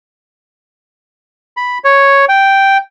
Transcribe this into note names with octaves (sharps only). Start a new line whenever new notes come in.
B5
C#5
G5